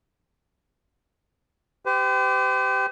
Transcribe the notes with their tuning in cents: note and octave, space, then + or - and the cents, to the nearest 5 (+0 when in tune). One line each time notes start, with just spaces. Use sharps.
G4 -10 C5 -45